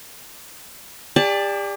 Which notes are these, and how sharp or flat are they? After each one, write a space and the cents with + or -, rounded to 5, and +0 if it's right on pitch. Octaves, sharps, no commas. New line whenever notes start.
G4 +40 D5 +0 A5 +0